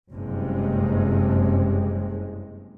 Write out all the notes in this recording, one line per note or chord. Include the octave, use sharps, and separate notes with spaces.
F#1 G2 C3 G#3